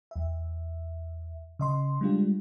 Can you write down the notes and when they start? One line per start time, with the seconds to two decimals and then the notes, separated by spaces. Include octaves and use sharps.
0.11 E2 E5
1.59 C#3 D#5 C6
2.01 G3 G#3 D4 F4 G4